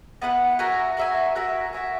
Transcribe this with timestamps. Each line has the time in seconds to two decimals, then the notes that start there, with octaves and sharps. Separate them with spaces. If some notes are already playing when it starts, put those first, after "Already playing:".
0.22 B3 E4 B4 F#5
0.59 F#4 A#4 E5 G#5
0.97 F#4 A#4 E5 G#5
1.35 F#4 A#4 E5 G#5
1.73 F#4 A#4 E5 G#5